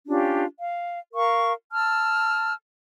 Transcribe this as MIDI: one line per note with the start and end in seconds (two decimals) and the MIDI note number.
0.07 0.44 61
0.07 0.44 62
0.07 0.44 65
0.07 0.44 67
0.59 0.98 77
1.13 1.52 70
1.13 1.52 77
1.13 1.52 85
1.72 2.53 81
1.72 2.53 88
1.72 2.53 89